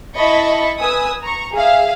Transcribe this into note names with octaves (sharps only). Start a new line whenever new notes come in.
E4 D#5 A5 B5 C#6
B4 G#5 D#6 E6
A#5 C#6
G#4 E5 F5